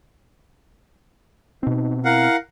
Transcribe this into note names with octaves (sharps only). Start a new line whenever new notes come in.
B2 C4 D#4
E4 A#4 F5 F#5